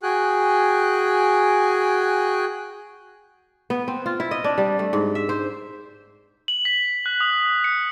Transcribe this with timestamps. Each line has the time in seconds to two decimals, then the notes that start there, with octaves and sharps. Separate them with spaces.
0.03 F#4 G#4 G5 G#5 F#6
3.70 B3
3.88 C4
4.06 F4
4.20 E4
4.31 D#5
4.44 D4
4.58 G3
4.79 A3
4.93 G#2
5.15 E5
5.29 C5
6.48 F#7
6.65 B6
7.06 F#6
7.20 D#6
7.64 C#7